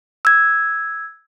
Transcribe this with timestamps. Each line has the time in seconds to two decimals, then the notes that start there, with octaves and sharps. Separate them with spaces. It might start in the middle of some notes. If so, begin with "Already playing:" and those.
0.25 E6 G#6